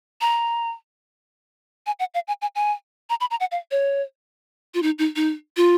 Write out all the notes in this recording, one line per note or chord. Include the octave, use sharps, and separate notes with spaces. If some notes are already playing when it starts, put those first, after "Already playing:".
A#5
G#5
F#5
F5
G#5
G#5
G#5
A#5
B5
A#5
F#5
F5
C#5
F4
D#4
D#4
D#4
F4